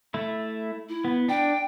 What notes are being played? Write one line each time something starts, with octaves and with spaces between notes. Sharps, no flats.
A3 E4
E4
B3
D4 G5